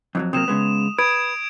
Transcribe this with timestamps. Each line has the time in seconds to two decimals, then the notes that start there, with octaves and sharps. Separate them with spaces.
0.15 F2 E3 F#3
0.33 C3 F#3 A#3 D#6 E7
0.48 C#3 G#3 B3
0.99 B4 D#6 G#6 D7